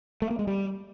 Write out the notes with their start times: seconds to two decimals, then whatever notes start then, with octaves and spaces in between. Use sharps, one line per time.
0.22 A3
0.30 A#3
0.39 G#3
0.47 G3